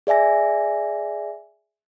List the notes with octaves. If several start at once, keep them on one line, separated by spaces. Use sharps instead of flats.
G#4 D5 E5 G#5 A#6